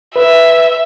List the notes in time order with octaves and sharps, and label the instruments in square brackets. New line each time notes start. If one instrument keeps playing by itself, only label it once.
[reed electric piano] B4 [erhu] E5